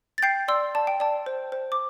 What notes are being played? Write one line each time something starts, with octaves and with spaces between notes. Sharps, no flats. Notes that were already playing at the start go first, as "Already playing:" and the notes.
A6
G5 G6 C7
D5 C6 E6
D5 A5
G5
D5 A5
C5
C5
D6